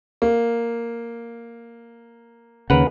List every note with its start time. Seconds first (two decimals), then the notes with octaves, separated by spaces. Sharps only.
0.22 A#3
2.70 D#2 C#3 A#4 B4 F#5